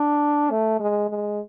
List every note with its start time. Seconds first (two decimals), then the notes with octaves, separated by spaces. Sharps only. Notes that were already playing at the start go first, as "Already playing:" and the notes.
Already playing: D4
0.51 A3
0.80 G#3
1.10 G#3